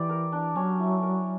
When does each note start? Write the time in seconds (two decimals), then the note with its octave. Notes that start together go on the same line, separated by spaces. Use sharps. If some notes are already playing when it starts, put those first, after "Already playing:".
Already playing: E3 G4 D5
0.09 A#4
0.32 D4
0.56 F#3 C#4
0.80 E4
1.02 A#4